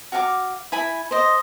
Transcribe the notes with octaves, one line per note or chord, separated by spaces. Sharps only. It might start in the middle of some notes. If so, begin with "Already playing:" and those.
F#4 F5 G#5 D6
E4 G#5 B5
C5 D#5